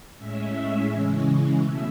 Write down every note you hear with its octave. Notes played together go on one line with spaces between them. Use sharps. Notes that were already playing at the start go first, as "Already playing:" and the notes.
A2 G#3 C#4 E5
C#3 E3 G#3 C#4
B2 A3 E5